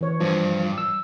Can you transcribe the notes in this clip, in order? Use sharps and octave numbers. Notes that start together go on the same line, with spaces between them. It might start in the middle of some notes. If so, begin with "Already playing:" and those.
E3 C#5
G2 F3
E6